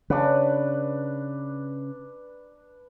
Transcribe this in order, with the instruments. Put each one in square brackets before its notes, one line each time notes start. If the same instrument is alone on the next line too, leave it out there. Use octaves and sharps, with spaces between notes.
[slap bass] C#3 [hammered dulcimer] D4 B4